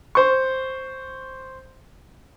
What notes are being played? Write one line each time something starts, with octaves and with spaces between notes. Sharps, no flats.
C5 C#6